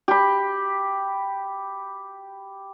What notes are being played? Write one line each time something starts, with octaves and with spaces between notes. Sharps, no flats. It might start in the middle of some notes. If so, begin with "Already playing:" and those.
G4 B5